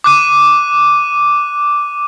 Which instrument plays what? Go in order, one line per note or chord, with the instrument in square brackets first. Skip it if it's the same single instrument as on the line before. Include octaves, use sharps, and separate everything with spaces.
[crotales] D6 F#6 D#7